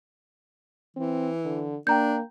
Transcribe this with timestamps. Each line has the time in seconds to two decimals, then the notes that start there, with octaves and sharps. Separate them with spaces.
0.97 E3 C4
1.45 D3
1.87 A#3 D4 G5 A#5 G6